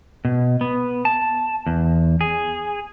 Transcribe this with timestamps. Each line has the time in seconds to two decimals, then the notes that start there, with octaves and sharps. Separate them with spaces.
0.25 B2
0.61 B3
1.05 A5
1.67 E2
2.21 G#4